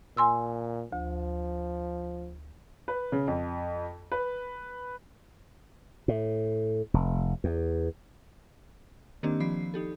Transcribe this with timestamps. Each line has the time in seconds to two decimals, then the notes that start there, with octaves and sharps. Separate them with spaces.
0.17 A#2 G#5 C6 E6
0.92 D2 F3
2.88 B4
3.12 C#3
3.28 F2
4.12 B4
6.08 A2
6.94 F1
7.44 E2
9.23 D#3 A#3 C4 D4 G4 D#5
9.40 F3 D5 B5 C7
9.74 D#4 G4 A4